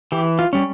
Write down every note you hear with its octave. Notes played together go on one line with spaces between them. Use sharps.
E3 G4
F4
G3 C#4